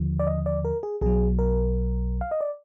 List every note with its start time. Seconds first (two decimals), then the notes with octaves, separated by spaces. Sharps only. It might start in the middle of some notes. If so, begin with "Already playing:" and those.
Already playing: D#2 D3 F3
0.19 D5
0.27 D#5
0.46 D5
0.65 A#4
0.83 G#4
1.01 B1 B2 F#3 G#4
1.39 A#4
2.21 F5
2.31 D#5
2.41 D5